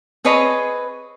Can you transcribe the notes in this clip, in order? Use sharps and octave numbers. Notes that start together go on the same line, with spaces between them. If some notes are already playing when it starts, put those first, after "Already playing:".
C4 G#4 B4 C#5 D#5